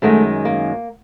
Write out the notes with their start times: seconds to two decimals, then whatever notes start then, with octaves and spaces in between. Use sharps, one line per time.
0.02 F#2 D#3 G#3 A3
0.45 A#3